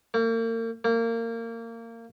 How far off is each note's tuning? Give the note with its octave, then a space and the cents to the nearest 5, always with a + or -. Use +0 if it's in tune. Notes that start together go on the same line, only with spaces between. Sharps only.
A#3 -40
A#3 -25